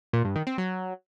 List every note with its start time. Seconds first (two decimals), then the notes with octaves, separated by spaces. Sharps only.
0.13 A#2
0.24 G2
0.36 D#3
0.47 C4
0.58 F#3